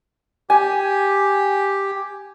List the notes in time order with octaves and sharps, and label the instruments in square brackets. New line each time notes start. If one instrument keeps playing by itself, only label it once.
[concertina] G4 [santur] G#5